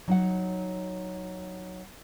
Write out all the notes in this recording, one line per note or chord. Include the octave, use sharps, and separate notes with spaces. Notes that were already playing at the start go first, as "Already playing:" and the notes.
F#3 D#4 F#5